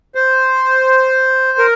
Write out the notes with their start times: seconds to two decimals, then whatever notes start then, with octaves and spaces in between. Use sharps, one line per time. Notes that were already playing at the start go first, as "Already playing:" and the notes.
0.15 C5
1.58 A#4